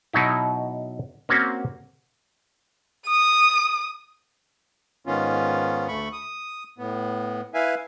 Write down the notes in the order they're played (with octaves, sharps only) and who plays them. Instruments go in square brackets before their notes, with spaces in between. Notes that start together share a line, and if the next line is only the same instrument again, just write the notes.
[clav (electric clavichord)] B2 F#3 D#4 E4
A#3 C4 C#4 F#4
[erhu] D#6
[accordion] G#2 D#3 B3 C#4 F4
D2 A3 B5 C#6
D#6
A2 B3
E4 B4 E5 F5 G#5